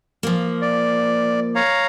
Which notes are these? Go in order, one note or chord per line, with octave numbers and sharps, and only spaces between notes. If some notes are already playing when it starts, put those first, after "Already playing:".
F3 A#3
D5
C#5 F5 A#5